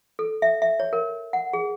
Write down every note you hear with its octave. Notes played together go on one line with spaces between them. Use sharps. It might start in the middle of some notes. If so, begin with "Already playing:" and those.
A4
E5
E5
C#5
A#4
F#5
G#4